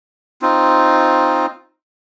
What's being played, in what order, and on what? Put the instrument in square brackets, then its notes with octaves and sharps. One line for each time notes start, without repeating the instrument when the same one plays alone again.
[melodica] C4 D#4 F4